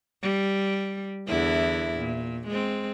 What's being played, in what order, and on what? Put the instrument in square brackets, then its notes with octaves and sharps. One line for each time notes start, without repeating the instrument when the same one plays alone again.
[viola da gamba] G3
E2 D3 E4
A#2
G#3 C4